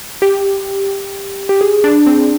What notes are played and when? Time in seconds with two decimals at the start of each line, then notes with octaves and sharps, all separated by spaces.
0.22 G4
1.49 G4
1.61 G#4
1.84 D4
2.06 C4